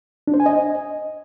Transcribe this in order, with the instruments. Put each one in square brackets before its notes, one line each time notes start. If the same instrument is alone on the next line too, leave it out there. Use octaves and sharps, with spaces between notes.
[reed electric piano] D4
C5
G#5
D#5